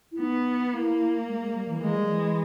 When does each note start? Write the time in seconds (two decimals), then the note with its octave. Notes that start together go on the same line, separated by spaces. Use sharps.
0.12 E4
0.20 B3 D#4
0.74 A#3 E4
1.28 G#3
1.41 G#3
1.55 G3
1.68 E3
1.82 E3 G#3
1.95 G3
2.08 E3